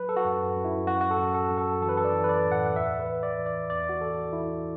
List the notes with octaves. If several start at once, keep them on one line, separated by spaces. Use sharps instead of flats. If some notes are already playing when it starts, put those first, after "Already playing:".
Already playing: F#3 B4
A4
F#4
F#2
F#2
E4
F#2 F#4
F#4
A4
F#2
A4
F#2
A4
E3 A4
B4
A4
D5
E3
B4
D5
A2
F#5
F#5
E2 E5
B4
E3
D5
E3
D5
E2 D5
F#4
E3 A4
E3 E4